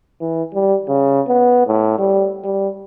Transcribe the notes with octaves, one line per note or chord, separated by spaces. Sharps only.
E3
G3
C#3
B3
A2
G3
G3